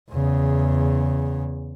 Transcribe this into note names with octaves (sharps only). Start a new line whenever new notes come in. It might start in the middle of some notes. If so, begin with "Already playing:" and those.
E2 C#3